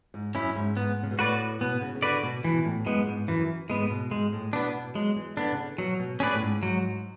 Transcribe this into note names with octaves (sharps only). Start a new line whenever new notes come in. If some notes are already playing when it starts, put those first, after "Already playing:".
G#2
F#2 C#4 E4
G#2
G#2 B3
C#3
B2
A2 F#4 B4 D5
B2 B3
C#3
C#3
D3 F#4 B4 D5
B2
B2 E3
A2
F#2 G#3 B3
G#2
F#2 E3
G#2 G#3 B3
A2
B2
G#2 G#3
A2
B2 B3 D4
B2
F#3 G#3
E3
D3 B3 D4
C#3
D3
B2 F#3
B2
A2 C#4 G#4 B4 D5
A2
G#2
G#2 F#3